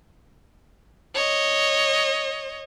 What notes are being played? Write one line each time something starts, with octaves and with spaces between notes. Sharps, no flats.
C#5 D#5